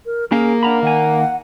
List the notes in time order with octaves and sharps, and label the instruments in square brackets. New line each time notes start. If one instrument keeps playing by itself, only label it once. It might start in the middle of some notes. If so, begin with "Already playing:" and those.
[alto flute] A#4
[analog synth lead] A#3 [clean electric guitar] C#4 A#4 F5 [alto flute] G#4
[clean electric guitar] D4 A#5 B5 [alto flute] F#5
[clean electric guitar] D#3 G#5 [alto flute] F#5